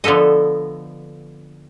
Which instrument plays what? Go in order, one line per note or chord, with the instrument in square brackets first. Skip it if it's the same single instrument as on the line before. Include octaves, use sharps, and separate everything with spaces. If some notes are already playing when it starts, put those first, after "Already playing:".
[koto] D3 F3 B3 A4 D#5